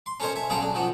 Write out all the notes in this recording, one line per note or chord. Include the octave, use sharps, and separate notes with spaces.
C6
C#4 A4 A#4 C5 C#5 D#5
E5 G#5
B1 C#3 G#4 A4 G5 A#5
D4
D#3 F3 F#4